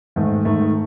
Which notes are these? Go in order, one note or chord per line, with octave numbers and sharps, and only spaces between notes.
G#2 D#3 A3
G#2 D#3 A3